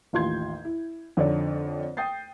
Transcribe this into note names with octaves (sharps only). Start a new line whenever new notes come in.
A1 D#2 F4 C6 G6 G#6
E4
F2 D3 D#4 C#5 D5
G5 D#6 G6 A6 C7